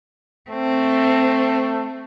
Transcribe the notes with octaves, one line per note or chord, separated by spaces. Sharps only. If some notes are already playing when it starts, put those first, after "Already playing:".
A3 C4